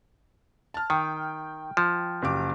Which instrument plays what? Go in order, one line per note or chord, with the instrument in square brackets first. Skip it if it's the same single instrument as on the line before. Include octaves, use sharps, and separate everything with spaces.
[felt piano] A5 F6
[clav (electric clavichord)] D#3 [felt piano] G5
[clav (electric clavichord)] F3
[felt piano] F#1 G4 D6